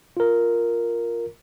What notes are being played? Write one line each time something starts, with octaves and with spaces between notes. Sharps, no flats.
F4 A#4